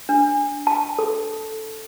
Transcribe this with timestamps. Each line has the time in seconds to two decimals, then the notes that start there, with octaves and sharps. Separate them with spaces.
0.09 D4
0.67 A5
0.99 A4